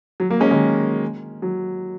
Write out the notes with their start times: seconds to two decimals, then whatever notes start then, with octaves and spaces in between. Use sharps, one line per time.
0.20 F#3
0.30 F#3 A#3
0.40 G#3 C#4
0.51 D#3 G#3
1.42 F#3